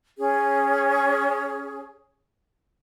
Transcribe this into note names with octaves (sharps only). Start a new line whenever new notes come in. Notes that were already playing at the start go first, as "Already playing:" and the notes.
C#4 G#4